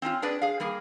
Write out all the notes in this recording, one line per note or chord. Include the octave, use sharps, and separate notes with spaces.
C4 C#4 D#4 F4
D4 G#4 B4 D5
G#4 F5
G3 A#3 G#4